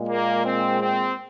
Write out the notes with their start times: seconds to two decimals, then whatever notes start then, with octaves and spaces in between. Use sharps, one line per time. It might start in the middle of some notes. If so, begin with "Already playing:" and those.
Already playing: A#2 G#3
0.08 A#3
0.45 C4
0.81 C4